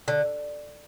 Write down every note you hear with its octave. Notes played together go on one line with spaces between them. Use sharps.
D3